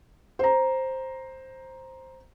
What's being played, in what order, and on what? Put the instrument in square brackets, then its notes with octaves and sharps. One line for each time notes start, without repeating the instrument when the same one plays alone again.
[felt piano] C5 A#5